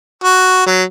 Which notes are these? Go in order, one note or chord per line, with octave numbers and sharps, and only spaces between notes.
F#4
F#3